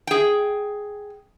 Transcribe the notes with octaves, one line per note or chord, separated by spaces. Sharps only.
G#4 G5